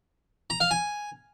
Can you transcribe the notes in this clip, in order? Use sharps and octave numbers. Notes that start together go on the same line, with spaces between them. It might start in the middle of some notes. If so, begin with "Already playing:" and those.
A#5
F5
G#5